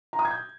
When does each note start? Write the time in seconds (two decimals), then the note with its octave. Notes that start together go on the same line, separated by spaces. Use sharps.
0.13 A#5
0.19 D#6
0.25 G#6
0.31 G6